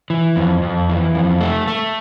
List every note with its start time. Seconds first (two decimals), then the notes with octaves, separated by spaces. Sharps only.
0.10 E3
0.36 F2
0.63 F2
0.89 E3
1.15 F2
1.41 A3
1.67 A3